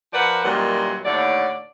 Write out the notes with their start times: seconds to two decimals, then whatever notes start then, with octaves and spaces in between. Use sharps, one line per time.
0.13 F3 A#4 B4 D5 F#5
0.44 F#2 A#2 D#3 E3 F#3 G3
1.05 D#2 A2 D3 C#5 D5